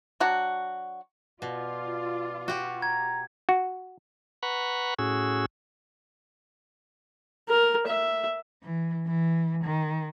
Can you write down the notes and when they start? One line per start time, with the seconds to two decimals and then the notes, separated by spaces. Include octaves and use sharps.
0.20 F#3 D4 F#4
1.42 B2 F4 D5
2.48 F#4 G4
2.82 A#5 G#6
3.49 F#4
4.43 B4 F#5 A#5 B5 C#6
4.99 A2 C#4 F#4 G#4 E6
7.48 A#4
7.87 E5
8.63 E3
9.06 E3
9.64 D#3